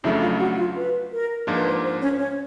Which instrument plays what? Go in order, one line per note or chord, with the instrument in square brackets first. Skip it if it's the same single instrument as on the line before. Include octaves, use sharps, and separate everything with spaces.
[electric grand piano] F2 C#3 F#3 A3 D4 [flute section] E4 E5
[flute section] F4 F5
F#4 F#5
F4 F5
B4
A#4
[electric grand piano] G#2 F3 A#3 D4 F4
[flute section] B4
C5
C5
C#4 C#5
C#4 C#5